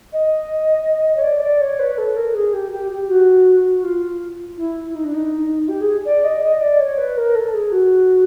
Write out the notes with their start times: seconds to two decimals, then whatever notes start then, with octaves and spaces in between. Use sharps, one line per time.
0.13 D#5
1.17 C#5
1.24 D5
1.43 D5
1.61 C#5
1.80 B4
1.98 A4
2.16 A#4
2.35 G#4
2.53 G4
2.72 G4
2.91 G4
3.09 F#4
3.83 F4
4.57 E4
4.95 D#4
5.04 D4
5.14 D#4
5.68 G4
5.81 G#4
6.06 D5
6.24 D#5
6.43 D#5
6.61 D5
6.79 C#5
6.98 B4
7.17 A#4
7.35 A4
7.54 G#4
7.72 F#4